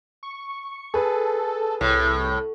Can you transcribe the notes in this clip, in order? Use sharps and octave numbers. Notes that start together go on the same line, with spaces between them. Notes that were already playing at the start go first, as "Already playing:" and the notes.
C#6
G#4 A4 B4
C2 A2